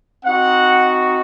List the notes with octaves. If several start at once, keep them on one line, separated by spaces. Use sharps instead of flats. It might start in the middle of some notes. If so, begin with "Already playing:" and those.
C4 D#4 F#4 F#5